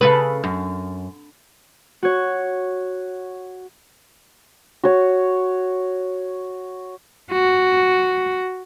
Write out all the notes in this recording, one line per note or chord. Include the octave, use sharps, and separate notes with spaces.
C#3 A4 B4
F#2
F#4 C#5
F#4 C#5
F#4